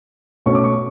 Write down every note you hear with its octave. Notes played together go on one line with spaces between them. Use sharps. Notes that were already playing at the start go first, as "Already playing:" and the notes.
B2 A3 C#4 C#6
D6
C#6